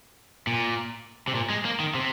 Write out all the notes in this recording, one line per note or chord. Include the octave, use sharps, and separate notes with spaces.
A#2
C3
A#2
G#3
A#3
D#3
C3